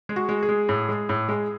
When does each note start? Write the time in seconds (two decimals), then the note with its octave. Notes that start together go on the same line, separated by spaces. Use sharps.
0.09 G#3 G#4
0.16 F#4
0.29 G#3
0.43 G#4
0.49 G#3
0.69 A2
0.89 G#3
1.09 A2
1.29 G#3